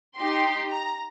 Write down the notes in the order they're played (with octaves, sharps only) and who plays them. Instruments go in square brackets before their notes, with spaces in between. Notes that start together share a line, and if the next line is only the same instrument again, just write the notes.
[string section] D#4 G4 C6
A#5